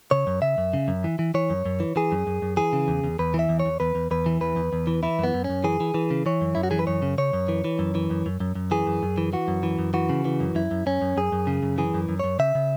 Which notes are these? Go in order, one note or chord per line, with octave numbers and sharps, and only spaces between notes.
C#3 C#5
F#2
C#3 E5
F#2
C#3
F#2
E3
E3
E3 C#5
F#2
F#2
E3
E3 G#4
F#2
F#2
F#2
E3 G#4
C#3
E2
E2
E2 B4
E3
E5
E2
C#5
E2
E2 B4
E2
E2 B4
E3
E2 B4
E2
E2
E3
E3 E4
F#2 B3
F#2
F#2 C#4
E3 G#4
E3
E3
C#3
E3 C#5
F#2
F#2 E4
F#4
E3 G#4
B4
F#2 C#5
C#3
C#3 C#5
F#2
E3
E3
F#2
E3
F#2
F#2
F#2
F#2
E3 G#4
F#2
F#2
E3
E3 F#4
F#2
E3
F#2
E3 F#4
C#3
E3
F#2
F#2 E4
F#2
F#2 C#4
F#2
F#2 G#4
F#2
C#3
F#2
E3 G#4
F#2
F#2
F#2 C#5
C#3 E5
C#3